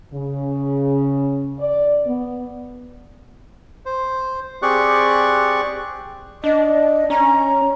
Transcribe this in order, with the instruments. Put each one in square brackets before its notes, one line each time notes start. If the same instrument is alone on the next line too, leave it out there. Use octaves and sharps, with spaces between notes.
[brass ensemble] C#3
D5
B3
[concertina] C5
C4 G4 G#4 D5 C#6 F#6
[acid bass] D4 [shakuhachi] D#5
[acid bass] C#4 [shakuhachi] A#5